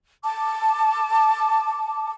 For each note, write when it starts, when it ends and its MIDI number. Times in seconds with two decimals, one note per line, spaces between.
0.24 2.11 81
0.24 2.11 86